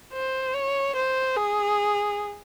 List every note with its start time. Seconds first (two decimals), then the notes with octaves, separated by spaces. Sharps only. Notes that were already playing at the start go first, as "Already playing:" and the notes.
0.13 C5
0.54 C#5
0.95 C5
1.36 G#4